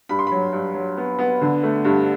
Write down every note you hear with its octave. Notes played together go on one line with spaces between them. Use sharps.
G2 B5
C6
F#3 B5
G2
F#3
B3
B3
D3
A3
G2